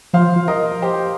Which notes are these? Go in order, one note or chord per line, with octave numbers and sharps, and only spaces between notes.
F3 C5 F5
F3
A#4 D#5
G4 C5